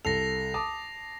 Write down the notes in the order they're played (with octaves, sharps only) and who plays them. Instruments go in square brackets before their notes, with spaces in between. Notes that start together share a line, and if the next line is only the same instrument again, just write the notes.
[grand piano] C2 A4 [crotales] A#6 C7 F7
[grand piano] A5 D6 D#6